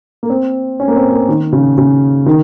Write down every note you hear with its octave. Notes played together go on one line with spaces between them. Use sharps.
A#3
C4
C#4
A#3
C4
A#3
D#3
C#3
C#3
D#3